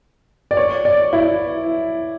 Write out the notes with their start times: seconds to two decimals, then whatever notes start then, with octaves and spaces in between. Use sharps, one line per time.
0.51 D5
0.57 C#5
0.85 D5
1.13 E4